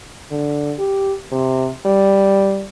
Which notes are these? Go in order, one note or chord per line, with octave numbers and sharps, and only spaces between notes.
D3
G4
C3
G3